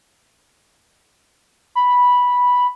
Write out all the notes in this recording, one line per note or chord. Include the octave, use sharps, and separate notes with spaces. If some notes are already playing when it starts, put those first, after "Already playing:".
B5